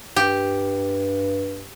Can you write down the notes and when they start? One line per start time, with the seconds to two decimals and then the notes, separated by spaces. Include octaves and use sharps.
0.16 G2 G4